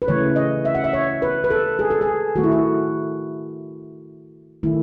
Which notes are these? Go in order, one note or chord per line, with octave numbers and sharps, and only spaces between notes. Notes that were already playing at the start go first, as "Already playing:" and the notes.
B4
C#3 E3 A3 C#5
D#5
E5
F#5
E5
C#5
B4
B4
A4
G#4
A4
G#4
D#3 A3 F#4
E4
F#4
D#3 A3 E4